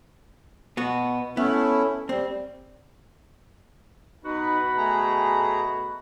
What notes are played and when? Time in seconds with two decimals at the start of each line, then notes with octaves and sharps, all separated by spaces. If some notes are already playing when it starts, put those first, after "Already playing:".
0.77 B2 B3 F#4
1.37 A3 B3 C#4 E4
2.09 G3 C4
4.24 B2 D#4 F#4 B4 B5
4.77 A3 G#4 A#5